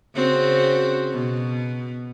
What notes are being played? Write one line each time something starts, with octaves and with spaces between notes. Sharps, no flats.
C#3 C4 F#4
B2